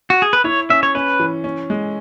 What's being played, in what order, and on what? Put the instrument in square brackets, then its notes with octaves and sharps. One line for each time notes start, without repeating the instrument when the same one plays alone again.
[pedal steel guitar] F#4
G#4
B4
[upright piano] E4 [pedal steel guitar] C#5
[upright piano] C#4 [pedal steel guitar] E5
[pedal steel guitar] C#5
[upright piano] C#4 [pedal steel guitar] B4
[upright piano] E3
C#4
G#3